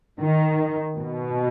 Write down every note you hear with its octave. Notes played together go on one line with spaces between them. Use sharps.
D#3
B2